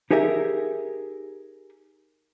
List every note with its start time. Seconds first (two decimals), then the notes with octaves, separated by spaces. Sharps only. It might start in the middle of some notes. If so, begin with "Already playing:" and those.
0.11 D#4 G4 G#4 A#4 E5